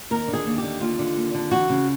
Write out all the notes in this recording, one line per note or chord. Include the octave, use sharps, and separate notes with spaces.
D#2 A#4
D3
G#4
D#2
G4
D3
D#2 F4
D3
D#2
D3
E3 F#4
C#3